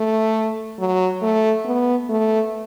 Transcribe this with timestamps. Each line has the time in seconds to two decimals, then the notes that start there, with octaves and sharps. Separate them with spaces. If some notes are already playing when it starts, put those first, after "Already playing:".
Already playing: A3
0.79 F#3
1.22 A3
1.65 B3
2.10 A3